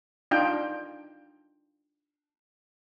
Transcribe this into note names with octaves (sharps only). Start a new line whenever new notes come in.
D4 D#4 F4 G5